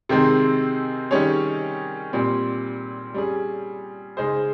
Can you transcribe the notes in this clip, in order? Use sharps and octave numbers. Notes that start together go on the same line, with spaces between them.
C3 D#3 G#3 C4
D#3 G3 C#4 G#4 C#5
A#2 G3 C4
G3 C#4 G#4
C#3 G#3 D#4 G#4 C5